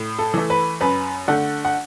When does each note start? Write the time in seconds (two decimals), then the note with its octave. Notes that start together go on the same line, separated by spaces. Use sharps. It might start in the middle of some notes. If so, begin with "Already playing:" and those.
Already playing: A2
0.19 A4
0.34 E3 A3
0.50 B4
0.81 F#2 B4
1.28 D3 A3 F#5
1.65 F#5